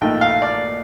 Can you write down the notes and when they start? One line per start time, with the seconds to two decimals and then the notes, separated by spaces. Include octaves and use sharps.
0.01 A#1 A2 A3 D#4 G5
0.21 F5
0.42 D5